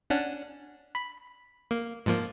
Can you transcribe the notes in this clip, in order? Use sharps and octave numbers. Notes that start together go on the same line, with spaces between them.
C#4 D4 F#5
B5
A#3
G#2 F3 A#3